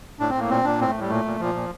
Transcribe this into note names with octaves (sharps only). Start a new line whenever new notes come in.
A2 D4
C4
A2 A#3
A#2 C4
A#2 D4
A2 C4
A3
A2
G3
A#2 A3
A#2
A#2 F3
A#2